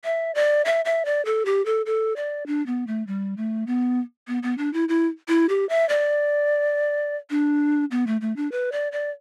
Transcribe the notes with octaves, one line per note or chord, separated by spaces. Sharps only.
E5
D5
E5
E5
D5
A4
G4
A4
A4
D5
D4
B3
A3
G3
A3
B3
B3
B3
D4
E4
E4
E4
G4
E5
D5
D4
B3
A3
A3
D4
B4
D5
D5